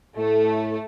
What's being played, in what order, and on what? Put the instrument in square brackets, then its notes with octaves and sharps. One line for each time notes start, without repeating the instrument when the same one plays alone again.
[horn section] A2 [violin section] A3